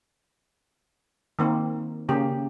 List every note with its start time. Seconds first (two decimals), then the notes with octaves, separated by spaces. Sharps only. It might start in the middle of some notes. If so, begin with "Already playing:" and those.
1.39 D#3 A#3 C4
2.09 C#3 A#3 G4